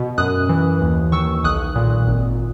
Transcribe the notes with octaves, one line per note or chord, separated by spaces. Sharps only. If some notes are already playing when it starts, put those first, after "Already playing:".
Already playing: B2
F#2 D#6 F#6
E3
D#2
D#3 C#6 E6
B1 D#6 F#6
A#2
G#1